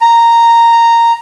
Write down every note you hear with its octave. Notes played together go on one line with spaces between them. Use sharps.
A#5